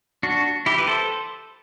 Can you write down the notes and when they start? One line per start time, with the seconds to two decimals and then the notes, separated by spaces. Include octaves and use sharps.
0.23 D4 F#4
0.66 E4 G4
0.78 B4
0.88 A4 C5